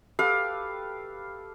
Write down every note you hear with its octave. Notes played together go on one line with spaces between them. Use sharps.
G4 A4 B4 F5